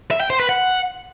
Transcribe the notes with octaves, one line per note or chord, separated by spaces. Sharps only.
E5
G5
C5
B4
F#5